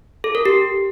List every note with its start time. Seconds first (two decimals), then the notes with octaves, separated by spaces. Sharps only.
0.24 A4
0.35 A#4
0.45 G4